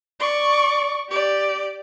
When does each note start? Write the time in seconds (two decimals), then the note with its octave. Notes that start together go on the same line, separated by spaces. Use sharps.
0.20 D5 C#6
1.09 G4 D5